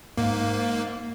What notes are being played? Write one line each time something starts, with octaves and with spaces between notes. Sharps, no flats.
G#2 A#3